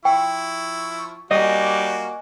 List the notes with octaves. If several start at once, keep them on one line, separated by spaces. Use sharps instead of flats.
F3 E4 G5 C#6
G3 A#3 F#4 D#5 G#5